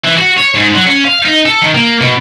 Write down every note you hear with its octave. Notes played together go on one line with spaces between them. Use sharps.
E3
F#4
C#5
G#2
F#3
C#4
F5
D#4
A4
D#3
A#3
B2